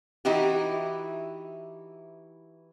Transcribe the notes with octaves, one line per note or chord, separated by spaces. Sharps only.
E3 D#4 E4 F#4 G4